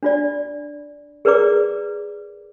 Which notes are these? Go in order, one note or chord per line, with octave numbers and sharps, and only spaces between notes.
D4 F4 D5
G#4 A#4 B4 D5 A#5 D6